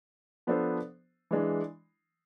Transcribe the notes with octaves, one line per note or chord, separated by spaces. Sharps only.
F3 B3 D4 A4 C5
E3 G#3 D4